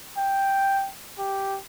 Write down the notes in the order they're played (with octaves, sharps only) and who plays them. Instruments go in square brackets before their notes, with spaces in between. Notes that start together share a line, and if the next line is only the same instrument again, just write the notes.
[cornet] G5
G4